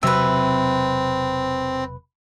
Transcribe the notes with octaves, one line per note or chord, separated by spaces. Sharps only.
E1 C3 F#3 C4 B4 E5